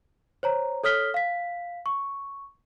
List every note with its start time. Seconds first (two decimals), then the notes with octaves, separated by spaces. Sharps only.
0.43 C5 C#5 A#5
0.84 A4 C#5 D#6 F6 B6 G7
1.14 F5 B6
1.86 C#6